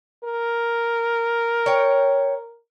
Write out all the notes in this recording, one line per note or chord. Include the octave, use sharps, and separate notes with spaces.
A#4
C#5 G5